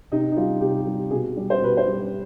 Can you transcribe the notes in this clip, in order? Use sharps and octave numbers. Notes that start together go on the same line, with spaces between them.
C3 D#4
D#4
G3 F4
C3 G4
G3
B2 G#4
G3
C5
B2 B4
C5
G3